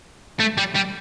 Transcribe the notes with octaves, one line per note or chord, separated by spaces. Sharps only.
A3
G3
G3